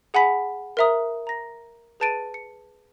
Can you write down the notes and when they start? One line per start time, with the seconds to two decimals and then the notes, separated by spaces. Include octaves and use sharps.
0.14 G#4 F#5 G#5 B5 B6
0.77 A#4 C5 E5 A#5 D#6
1.27 A#5 A#6
2.00 G#4 B4 A5 A6 D7 D#7
2.34 C#7